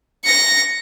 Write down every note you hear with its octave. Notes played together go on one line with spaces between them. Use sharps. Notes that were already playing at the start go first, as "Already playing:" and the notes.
A#6 C#7